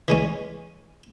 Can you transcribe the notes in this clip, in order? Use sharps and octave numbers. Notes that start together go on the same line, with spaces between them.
E3 G#3 C#4